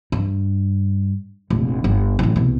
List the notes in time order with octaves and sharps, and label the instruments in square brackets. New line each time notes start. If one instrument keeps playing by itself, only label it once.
[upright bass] G2
F1 A#1
G1
D1 A1
C2 B2